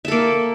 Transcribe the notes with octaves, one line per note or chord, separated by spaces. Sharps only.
A#3 A4 E5